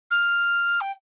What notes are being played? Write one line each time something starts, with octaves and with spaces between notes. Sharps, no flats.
F6
G5